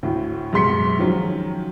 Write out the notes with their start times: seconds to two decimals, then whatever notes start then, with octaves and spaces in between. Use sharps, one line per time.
0.03 D2 A2
0.53 F#2 B2 G#3 C6 B6 C#7
0.99 D#3 F3 F#3 C#4